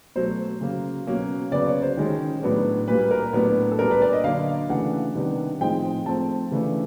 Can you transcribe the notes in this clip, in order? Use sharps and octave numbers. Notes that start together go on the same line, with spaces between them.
B2 F#3 A3 C5
C#3 F#3 A#3
B2 F#3 A#3 C#4
C#3 F#3 B3 D5
C#5
C5
D#3 G#3 C#4
A2 F#3 B3 D4
A#2 G3 A#3 B4
A#4
A2 F#3 B3 D4
A4
A#2 G3 B3 D4 A#4
B4
D5
D#5
D3 F#3 A#3 D4 F5
C#3 E3 A3 D4 F#5
C3 D#3 G3 B3 D4
A2 F3 G#3 C4 D#4 G5
F3 A3 C4 A5
C#3 E3 A3 D4